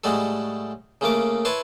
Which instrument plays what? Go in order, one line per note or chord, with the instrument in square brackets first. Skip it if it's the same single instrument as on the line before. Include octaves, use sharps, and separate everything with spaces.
[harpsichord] A2 G3 G#3 F#4 A4
C#3 A3 A#3 D6
E4 B4 C#5 A5 C6